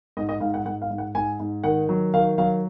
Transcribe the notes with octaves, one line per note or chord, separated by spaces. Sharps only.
G#2 D#5
D#5
G#2 F5
F#5
G#2 F#5
F5
G#2
F#5
G#2 G#5
G#2
D#3 F#5
F#3
D#3 F5
F#3 F5